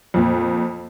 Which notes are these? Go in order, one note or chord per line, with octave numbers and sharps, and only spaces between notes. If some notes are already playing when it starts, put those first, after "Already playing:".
F2 A#2